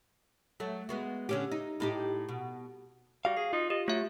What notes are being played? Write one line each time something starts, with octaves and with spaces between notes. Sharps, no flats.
F#3 A3
G#3 B3 F#4
D3 C#4 G4
D#4
A2 D#4 G4
B2
G3 F#4 F5
G#4 C7
D#4 F4
G4 D#5
F#3 A3 F4 E5